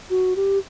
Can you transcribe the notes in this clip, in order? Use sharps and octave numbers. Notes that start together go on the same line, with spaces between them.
F#4
G4